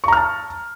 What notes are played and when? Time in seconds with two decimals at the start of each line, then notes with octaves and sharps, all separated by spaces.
0.04 C#6
0.08 A#5
0.13 F6
0.17 A5